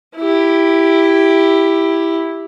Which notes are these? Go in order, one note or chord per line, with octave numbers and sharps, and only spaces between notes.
E4 G4